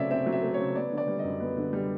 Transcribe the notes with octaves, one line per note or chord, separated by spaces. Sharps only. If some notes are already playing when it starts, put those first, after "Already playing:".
Already playing: C#3 F#3 A3 C4 C#5 D5 E5
C4 E5
F#3
E5
A3
C#5
C#3
B3 D5
D3
D5
G3
D#5
F#2
B3
D3
G3